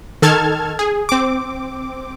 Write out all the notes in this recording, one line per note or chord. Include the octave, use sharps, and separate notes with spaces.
D#3 A4 A5 F6 G#6
G#4
C4 D6